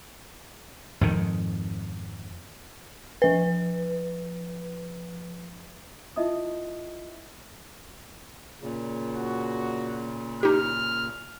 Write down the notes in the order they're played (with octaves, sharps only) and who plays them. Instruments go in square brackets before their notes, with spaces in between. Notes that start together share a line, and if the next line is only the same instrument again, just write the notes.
[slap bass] F2 G#2 D#3
[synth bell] F3 B4
[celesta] E4 F4 D#5 E5 D#6
[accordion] A#2 C#3
[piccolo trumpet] F#4
[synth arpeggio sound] D#4 G4 [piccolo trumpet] F6